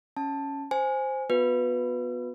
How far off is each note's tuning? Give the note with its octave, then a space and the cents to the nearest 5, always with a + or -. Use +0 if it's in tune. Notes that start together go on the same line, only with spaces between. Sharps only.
C#4 +0 A5 +0
C5 +0 G#5 +0
B3 +0 F#4 -40 B4 +0